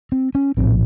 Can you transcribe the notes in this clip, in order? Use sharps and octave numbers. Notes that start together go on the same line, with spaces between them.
C4
C#4
A#1 A2 C4